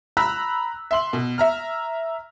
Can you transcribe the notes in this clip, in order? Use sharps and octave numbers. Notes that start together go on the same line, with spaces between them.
A#5 B5 E6 F#6 B6
E5 C6 F#7
B2
E5 A#5 F6